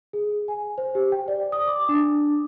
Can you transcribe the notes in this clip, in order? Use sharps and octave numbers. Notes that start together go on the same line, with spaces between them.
G#4
G#5
C5
G4
G5
D5
D#6
D6
D4